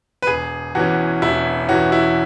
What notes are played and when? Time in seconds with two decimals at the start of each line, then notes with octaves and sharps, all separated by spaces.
0.22 B4
0.27 E1 G#4
0.75 E2 E3 C#4 F#4
1.22 E1 E4
1.68 E2 E3 C#4 F#4
1.92 E4